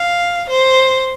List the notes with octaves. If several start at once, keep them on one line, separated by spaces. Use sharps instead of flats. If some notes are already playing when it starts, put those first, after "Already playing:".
Already playing: F5
C5